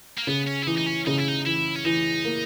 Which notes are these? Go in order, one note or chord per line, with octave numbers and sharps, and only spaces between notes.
A#3
C#3 B3
C#4
E4
E3 D#4
D#4
C#4
C#3 D#4
E4
D#4
E3 E4
C#4
E3 D#4
A#3